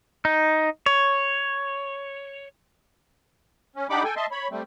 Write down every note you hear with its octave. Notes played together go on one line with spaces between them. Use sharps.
D#4
C#5
C#4
D4 D#4 G4 F#5 B5 D6
A4 G5 G#5
D#5 E5 A5 C6
C#5 B5
G3 A3 C4